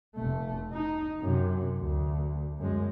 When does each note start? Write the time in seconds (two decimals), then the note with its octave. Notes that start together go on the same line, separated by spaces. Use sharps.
0.15 F1 A3
0.72 D#4
1.20 F#2 C3
1.78 D2
2.58 F#2 G#3